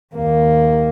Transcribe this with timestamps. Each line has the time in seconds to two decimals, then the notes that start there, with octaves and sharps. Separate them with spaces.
0.15 D#2 A#3